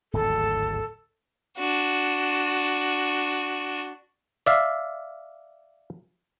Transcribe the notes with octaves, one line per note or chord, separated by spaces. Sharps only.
D1 G#1 E2 A4
D4 F#4
D5 E5 F5